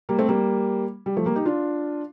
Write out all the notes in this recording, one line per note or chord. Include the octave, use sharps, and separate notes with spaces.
G3 A#3
A3 C4
G3 A#3
G3
F3 A3
G3 A#3
D#4 G4
D4 F4